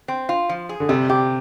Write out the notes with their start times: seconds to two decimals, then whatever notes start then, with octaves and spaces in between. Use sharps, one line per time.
0.08 C4
0.29 F4
0.49 F3
0.69 G#4
0.80 D3
0.89 C3 G3
1.09 C3 G4